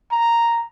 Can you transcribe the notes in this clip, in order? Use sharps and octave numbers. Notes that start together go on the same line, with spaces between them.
A#5